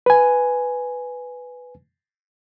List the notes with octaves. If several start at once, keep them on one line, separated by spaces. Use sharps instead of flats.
B4 G#5